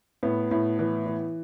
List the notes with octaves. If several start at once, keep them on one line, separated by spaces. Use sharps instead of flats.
A2 B3
A2
E3
E3